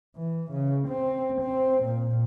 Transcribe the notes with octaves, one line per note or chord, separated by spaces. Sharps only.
E3
C#3
C4
C4
A#2